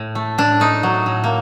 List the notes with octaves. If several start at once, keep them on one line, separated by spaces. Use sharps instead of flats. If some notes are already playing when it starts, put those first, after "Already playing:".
Already playing: A2
A3
A2 D4
A3 D#4
F#3
A2
A#3